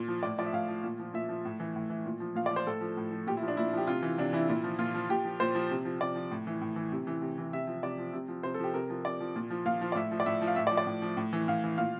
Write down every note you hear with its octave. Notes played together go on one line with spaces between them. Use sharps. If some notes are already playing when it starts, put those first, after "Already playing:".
Already playing: A#2
F3
A2 D5
F3 D5
E5
A2 F5
F3
A#2
F3
A#2 E5
F3
A2
E3
A2
E3
A#2
F3
A#2 F5
D5
F3
C5
A2 A4
F3
A2
F3
A#2 G4
E4
F3
D4
A#2 E4
F3 G4
C3 F4
E3
C3 D4
E3 E4
A#2 E4
F3
A#2 F4
F3
A#2 G4
F3
A#2 C5
F3
C3
F3
C3 D5
F3
A2
E3
A2
E3
C3
E3
C3
E3
C3 E5
F3
C3 D5
F3
C3
F3
C3 C5
A4
F3 G4
C3 A#4
F3
C3 D5
F3
A#2
F3
A#2 F5
F3
D5
A2 E5
F3
D5
A2 E5
F3
F5
A2 E5
D5
F3
D5
A2
F3
A2
E3
A2 F5
E3
A#2 F5